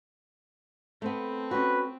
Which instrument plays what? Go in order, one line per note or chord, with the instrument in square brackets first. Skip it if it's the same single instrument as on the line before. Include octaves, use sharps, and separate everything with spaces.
[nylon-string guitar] A3 B3 [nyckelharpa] C4
[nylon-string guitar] C#4 F#4 [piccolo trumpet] B4